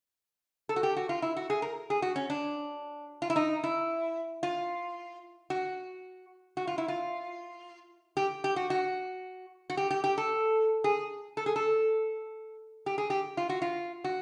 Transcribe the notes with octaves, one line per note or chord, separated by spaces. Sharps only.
A4
F#4
G4
F#4
F4
E4
F#4
G#4
A#4
G#4
F#4
C#4
D4
F4
E4
D#4
E4
F4
F#4
F#4
F4
E4
F4
G4
G4
F#4
F#4
F#4
G4
G4
G4
A4
G#4
A4
G#4
A4
G4
G#4
G4
F4
F#4
F4
F#4